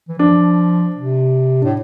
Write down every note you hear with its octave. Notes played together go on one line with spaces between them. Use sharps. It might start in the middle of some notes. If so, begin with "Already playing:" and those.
E3
F3 D4
C3
A2 D4